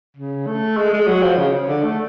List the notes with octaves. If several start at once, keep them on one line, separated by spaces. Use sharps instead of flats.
C#3
A3
G#3
G#3
F#3
F3
C#3
D3
A3